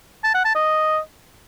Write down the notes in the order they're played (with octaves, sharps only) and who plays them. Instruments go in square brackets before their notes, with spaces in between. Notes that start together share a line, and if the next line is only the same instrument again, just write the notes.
[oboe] A5
F#5
A5
D#5